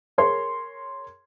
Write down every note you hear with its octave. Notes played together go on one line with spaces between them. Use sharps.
G#4 A#4 C#5 C6